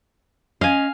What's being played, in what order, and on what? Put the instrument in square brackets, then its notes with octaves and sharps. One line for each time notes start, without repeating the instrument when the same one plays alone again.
[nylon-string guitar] C#4 D#5 [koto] F5 G#5